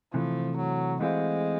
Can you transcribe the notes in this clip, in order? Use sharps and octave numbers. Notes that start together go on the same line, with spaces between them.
C3 E3 F3 A3
F#3
E3 G#3 A3 C4 F4